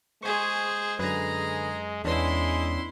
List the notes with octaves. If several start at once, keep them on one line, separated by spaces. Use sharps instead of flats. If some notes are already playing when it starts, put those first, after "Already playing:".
G#3 G#4 C5 G#5 C6 C#6
F#2 D3 G#4 B4 A#5
E2 G#3 B3 C#4 D4 E4 C6